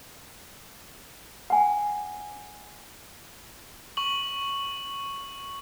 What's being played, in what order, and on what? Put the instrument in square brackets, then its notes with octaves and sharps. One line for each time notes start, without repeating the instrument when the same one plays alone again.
[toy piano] F#5 G#5
[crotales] C#6 F#7